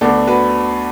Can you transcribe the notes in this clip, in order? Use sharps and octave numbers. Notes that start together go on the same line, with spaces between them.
D2 D3 B3 D4 A4 D5
F#4 B4